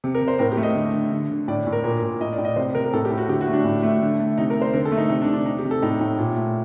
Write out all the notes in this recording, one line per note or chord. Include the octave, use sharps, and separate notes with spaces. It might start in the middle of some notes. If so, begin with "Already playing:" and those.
C3
A#4
C3
C5
A2 A#4
G4
A3
D#5
D3
D3
D3
D3
A2 D5
A2
A#4
A#2 A#4
A#2
A2 D#5
D5
A2
D#5
C3 C5
C3 A#4
A#4
A2 A4
G4
A2
F#4
D3 G4
F#4
A3
D4
A2
A3
D3
A3
C3 D#4
A#4
C3
C5
D3 A#4
A4
A3
D#4
C3 D#4
D4
C3
D4
C3 D#4
G4
C3
A4
A2 D#4
A2
A#2
A3